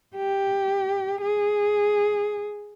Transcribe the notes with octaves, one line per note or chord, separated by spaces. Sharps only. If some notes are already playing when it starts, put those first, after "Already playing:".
G4
G#4